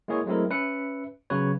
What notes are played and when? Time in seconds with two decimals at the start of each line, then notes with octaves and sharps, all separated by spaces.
0.08 G#3 A#3 E4 G#4 C#5
0.26 F#3 G#3 A3 C4 E4 A#4
0.50 C#4 B4 E5 C#7
1.30 C#3 F#3 B3 B4 C#5